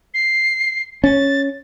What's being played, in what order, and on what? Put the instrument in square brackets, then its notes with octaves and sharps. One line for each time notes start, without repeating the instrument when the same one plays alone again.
[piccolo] C7
[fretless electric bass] C#4 [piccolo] A6